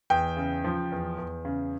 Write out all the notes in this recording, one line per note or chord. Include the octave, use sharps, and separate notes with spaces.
E2 G5
C#3
F3
E2
E2
C#3